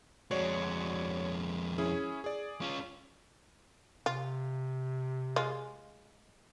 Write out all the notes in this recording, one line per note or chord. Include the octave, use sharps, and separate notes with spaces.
F2 G#3 F#4 C#5 D5
C#4 E4 G#4
G#4 D5
C#4 F4
C3 F4
G#3 F4